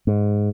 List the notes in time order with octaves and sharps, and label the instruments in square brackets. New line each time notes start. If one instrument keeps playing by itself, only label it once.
[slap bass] G#2